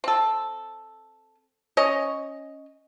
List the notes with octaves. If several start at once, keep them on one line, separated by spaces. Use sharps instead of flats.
C4 A4
C#4 C#5 D#5